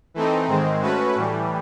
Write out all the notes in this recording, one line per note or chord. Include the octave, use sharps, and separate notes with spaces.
E3 A3 C4 D#4
G#2 D#3 G#3 C4
A3 C#4 F#4 B4
A2 E3 G3